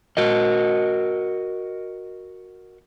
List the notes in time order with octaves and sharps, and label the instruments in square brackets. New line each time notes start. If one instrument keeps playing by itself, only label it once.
[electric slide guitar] F#4 A#4 D#5